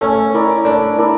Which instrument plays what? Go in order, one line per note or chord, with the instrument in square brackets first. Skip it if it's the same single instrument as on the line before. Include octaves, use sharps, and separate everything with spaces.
[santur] A3 [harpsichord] C#4
[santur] E4 A#4 D5
[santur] A3 [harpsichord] D4
[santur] E4 A#4 D5